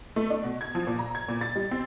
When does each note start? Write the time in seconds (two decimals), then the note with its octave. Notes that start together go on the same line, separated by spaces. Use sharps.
0.16 A3
0.30 D4
0.44 B2
0.61 G#6
0.75 F3
0.87 A#2
0.99 A#5
1.15 G#6
1.28 A#2
1.41 A6
1.55 G3
1.71 C4